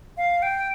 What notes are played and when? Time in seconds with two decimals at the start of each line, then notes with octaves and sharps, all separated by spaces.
0.17 F5
0.42 G5